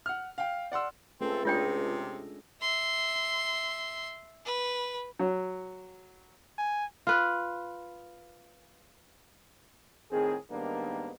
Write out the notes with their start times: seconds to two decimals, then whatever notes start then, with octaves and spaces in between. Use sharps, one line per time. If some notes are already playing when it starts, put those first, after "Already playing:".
0.06 F#5 F6
0.38 F5 G5
0.72 D5 F#5 C6 E6
1.21 C#2 A3 C4 C#4 A4
1.45 C3 G#3 D4 F4 C#5 D#5 G5
2.61 E5 C6
4.46 B4
5.19 F#3
6.58 G#5
7.07 F4 B4
10.12 A2 D#3 C4 G#4
10.50 G#2 D#3 G3 A#3 B3 D4